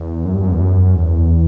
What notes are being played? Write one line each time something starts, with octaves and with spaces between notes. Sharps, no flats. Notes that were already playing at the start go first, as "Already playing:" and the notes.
Already playing: E2
F#2
G2
F#2
E2
F#2
E2